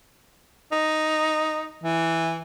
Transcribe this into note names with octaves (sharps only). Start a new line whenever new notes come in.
D#4
E3